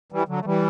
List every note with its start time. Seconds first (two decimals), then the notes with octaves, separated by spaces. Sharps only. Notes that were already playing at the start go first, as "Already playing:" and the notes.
0.12 E3 G3
0.28 D3 F#3
0.40 A3
0.45 E3 G3